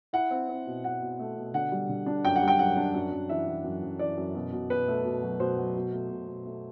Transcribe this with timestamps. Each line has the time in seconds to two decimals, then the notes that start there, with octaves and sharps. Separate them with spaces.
0.13 E4 F#5
0.31 C4
0.49 C4
0.67 B2
0.84 B2 F#5
1.01 B2
1.20 A3
1.37 B2
1.54 D3 F#5
1.72 G3
1.89 D3
2.06 D4
2.25 F#2 G5
2.36 F#5
2.42 G3
2.48 G5
2.59 F#2 F#5
2.76 D4
2.94 F#2
3.12 F#2
3.29 E3 E5
3.47 E3
3.64 F#2
3.83 F#2
3.99 E3 D5
4.17 F#2
4.35 B2
4.52 B2
4.70 B2 B4
4.88 A3
5.04 B2
5.22 F#3
5.40 B2 C5
5.58 F#3
5.75 B2
5.92 A3
6.10 B2
6.28 B2
6.45 A3